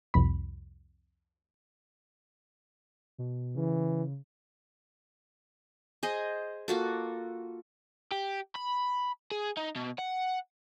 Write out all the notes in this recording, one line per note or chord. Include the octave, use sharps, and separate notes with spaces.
C2 F2 B5
B2
C#3 E3
G#4 C5 D#5
A#3 F4 F#4 A4
G4
B5
G#4
D#4
B2
F#5